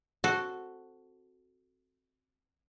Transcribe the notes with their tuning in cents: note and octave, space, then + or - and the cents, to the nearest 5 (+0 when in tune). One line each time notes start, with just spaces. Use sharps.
C4 +0 F#4 +0 A4 +0